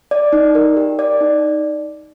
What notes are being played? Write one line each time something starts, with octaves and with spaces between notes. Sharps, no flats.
D5
D#4
A#4
G4
D5
D#4